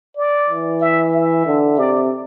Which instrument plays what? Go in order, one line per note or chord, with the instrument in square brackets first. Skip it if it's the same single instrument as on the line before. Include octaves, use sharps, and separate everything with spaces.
[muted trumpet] D5
[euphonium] E3
[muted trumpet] E5
E5
[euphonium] D3
[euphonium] C3 [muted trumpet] D5